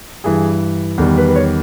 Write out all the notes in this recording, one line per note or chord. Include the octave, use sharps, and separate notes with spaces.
G2 E3 G3 G#4
E2 D#3 G3
B4
B4
C#5